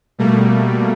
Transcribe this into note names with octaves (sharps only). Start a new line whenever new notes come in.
B2 G3 A3 A#3